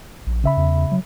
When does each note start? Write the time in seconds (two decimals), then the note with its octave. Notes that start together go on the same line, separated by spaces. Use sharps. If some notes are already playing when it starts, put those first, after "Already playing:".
0.27 A#1
0.44 C#3 E5 B5
0.57 E2
0.92 F#3